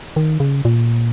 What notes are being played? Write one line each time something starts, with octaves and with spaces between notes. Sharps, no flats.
D#3
C#3
A#2